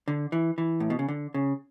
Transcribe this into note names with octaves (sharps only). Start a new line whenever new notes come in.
D3
E3
E3
A2
B2
C#3
D3
C#3